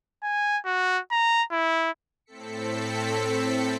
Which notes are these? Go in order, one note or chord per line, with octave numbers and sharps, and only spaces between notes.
G#5
F#4
A#5
E4
A2 C4 A4 B6 C#7